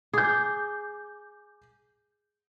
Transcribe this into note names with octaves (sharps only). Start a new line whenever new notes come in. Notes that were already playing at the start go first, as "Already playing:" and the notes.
G#4 D6 G6